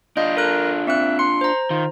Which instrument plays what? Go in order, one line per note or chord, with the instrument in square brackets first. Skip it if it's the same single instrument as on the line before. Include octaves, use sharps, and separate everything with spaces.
[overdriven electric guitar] D4 F4 [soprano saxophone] D#5 [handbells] G6
[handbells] A4 F#6 [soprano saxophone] A#4
[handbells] C4 F#6 [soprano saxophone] E5
[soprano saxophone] C6 [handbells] C#7
[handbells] C5 A#5
[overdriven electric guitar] D#3 [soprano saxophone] F4